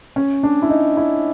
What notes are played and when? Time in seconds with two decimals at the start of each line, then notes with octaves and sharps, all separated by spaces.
0.16 C#4
0.43 D4
0.62 E4
0.70 D#4
0.97 E4